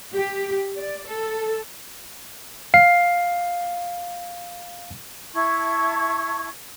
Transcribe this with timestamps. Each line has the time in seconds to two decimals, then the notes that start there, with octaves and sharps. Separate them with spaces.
0.14 G4
0.77 D5
1.07 A4
2.74 F5 C7
5.35 E4 A5 C#6 G#6